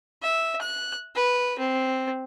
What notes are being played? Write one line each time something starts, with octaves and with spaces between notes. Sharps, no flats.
E5
F#6
B4
C4